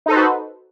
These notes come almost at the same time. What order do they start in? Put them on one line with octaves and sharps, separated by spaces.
D#4 A4 C5 B4 F#4